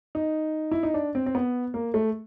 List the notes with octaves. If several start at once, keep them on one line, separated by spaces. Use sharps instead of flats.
D#4
E4
D#4
D4
C4
C4
B3
A#3
A3